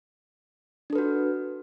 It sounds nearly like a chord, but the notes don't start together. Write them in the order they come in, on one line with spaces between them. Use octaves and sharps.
D4 A4 B4 F#4